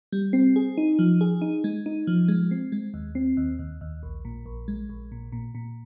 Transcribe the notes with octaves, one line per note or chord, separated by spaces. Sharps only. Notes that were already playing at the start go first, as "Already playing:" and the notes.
G3
C4
G#4
D#4
F3
G#4
D#4
G#3
D#4
F3
G#3
C4
G#3
D#2
C4
D#2
D#2
D#2
A#1
A#2
A#1
G#3
A#1
A#2
A#2
A#2